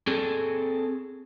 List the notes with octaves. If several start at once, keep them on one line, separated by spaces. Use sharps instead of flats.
C4 G#4 A4